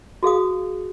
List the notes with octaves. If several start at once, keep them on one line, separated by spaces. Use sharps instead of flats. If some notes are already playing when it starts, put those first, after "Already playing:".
F#4 G#4 F5 D#6